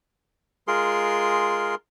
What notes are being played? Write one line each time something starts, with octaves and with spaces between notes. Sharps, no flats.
G#3 F4 G#4 A#4 C6